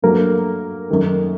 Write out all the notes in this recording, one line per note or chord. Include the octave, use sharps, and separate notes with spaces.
G2 F#3 A3 A#3 A#4
F#2 D#3 A3